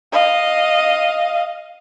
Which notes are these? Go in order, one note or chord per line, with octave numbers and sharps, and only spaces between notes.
D#5 F5